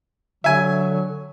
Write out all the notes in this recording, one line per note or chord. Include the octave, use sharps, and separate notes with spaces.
D3 F#3 E5 G#5